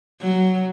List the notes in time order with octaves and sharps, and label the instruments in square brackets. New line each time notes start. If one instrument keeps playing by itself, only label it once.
[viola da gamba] F#3